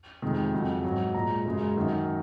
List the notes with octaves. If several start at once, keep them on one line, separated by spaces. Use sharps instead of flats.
F2 C3 D#3 G#3
F2 C#3 F#3
G#2 F#3
A#2 G#3 A#5
F#2 C#3 G#3
F#2 D#3 F#3